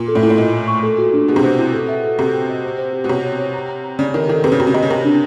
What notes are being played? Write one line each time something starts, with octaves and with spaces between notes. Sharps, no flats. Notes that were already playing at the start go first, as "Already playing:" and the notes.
Already playing: A#2
A4
A2
A#2 E4
A2
A#2 D#5
G#5
C#6
A4
F#4
D4
B2 G#4
C3
B2 C5
E4
A4
E5
A4
C3 C5
G5
D#5
C5
C5
G4
B2
C3 C#5
C#5
C#5
A#5
A#5
A#5
C#3 D5
D#3 A4
D#3 A4
C3 B4
C#3
C3 F#4
C#3
C3 D#5
C#3
C3 A#4
D4